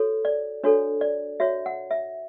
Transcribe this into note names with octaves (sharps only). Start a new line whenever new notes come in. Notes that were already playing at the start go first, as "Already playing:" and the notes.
Already playing: F#4 A4 C#5
D5
D4 F#4 A4 C#5
D5
F#4 C#5 E5
F#5
E5